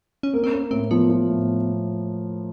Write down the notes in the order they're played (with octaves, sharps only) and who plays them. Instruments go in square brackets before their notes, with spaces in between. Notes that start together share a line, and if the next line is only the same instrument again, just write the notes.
[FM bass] C#4
[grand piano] A#3 [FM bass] C4
[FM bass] C4
[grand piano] A#3 [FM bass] C#4
[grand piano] A2 [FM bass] C4
[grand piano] F3 [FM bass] B3
[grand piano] F3
A2